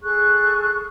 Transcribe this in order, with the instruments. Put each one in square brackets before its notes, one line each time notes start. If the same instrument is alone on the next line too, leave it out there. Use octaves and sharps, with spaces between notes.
[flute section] G#4 A4 C#6 F#6